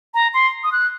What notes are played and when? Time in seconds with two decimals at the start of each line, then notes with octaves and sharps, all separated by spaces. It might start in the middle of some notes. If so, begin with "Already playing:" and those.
0.14 A#5
0.34 C6
0.64 D#6
0.72 F#6